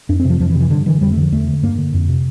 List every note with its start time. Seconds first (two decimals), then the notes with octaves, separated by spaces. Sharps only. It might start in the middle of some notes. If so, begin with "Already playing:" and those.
0.09 F2 D4
0.20 C4
0.25 C3 F3
0.40 F2 F3
0.50 E3
0.55 C3
0.61 E3
0.70 G2 D3
0.86 D3 E3
1.01 F2 G3
1.11 A3
1.17 D3 F3
1.32 E2 A3
1.47 D3
1.63 G2 A#3
1.78 D3
1.94 F2
2.09 C3